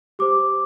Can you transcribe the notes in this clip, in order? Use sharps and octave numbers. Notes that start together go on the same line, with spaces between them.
G4 C5 D6